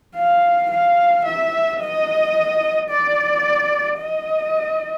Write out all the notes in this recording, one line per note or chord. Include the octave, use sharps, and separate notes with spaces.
F5
F5
E5
D#5
D5
D#5